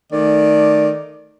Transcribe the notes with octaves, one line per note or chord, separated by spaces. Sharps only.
D#3 A3 D5